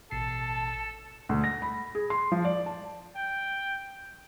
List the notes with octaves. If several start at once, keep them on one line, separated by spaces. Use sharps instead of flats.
A1 B2 A4 A5 C7
D2
A#6
B5
G#4
C6
F3
D5
A5
G5